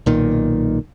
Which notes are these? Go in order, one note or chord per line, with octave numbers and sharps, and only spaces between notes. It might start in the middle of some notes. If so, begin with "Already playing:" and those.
B1 A#2 D#3